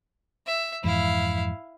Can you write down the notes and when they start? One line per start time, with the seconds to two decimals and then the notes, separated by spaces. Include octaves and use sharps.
0.47 E5
0.84 F2 G#2 E3 E4 F5